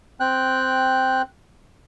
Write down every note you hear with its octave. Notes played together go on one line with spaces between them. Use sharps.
C4 G5 F#6